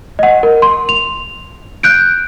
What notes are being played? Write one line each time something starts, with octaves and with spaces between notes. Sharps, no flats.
D#5 F#5
A#4
C6
F7
F#6 G6 D7